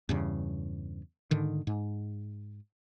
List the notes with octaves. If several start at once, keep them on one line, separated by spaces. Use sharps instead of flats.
E2 G2 C#3
G#2 D3 D#3
G#2